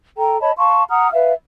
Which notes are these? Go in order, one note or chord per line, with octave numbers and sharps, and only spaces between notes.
A4 G5 A#5
C#5 D#5 A5 B5
F5 A5 C6 C#6
F#5 A#5 D#6 F6
B4 E5 F5